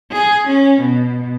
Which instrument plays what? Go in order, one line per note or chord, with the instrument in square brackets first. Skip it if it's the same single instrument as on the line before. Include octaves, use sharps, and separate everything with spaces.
[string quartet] G#4
C#4
B2